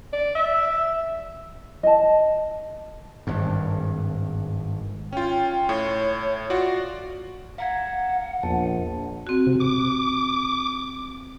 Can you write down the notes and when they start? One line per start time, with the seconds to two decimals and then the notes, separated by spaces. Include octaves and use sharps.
0.13 D5
0.35 E5
1.83 D#5 A5
3.27 G#1 G2
5.13 C#4 F4 G5
5.69 A2 C#5
6.50 F4 F#4 D5
7.58 F5 F#5 A#5 G#6
8.43 A#1 E2 A5
9.27 C4 F#4
9.47 C3
9.60 D6